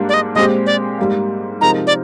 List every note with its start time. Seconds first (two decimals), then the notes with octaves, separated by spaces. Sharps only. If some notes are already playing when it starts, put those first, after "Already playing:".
Already playing: G#2 G3 A#3 D4
0.09 D5
0.14 D#5
0.35 A#2 G#3 C4 G4 D#5
0.66 D5
0.98 G#2 G3 A#3
1.61 C3 F3 G#3 D#4 A#4 A#5
1.87 D5